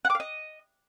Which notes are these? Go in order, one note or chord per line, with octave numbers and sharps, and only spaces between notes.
F#5
D6
F5
D#5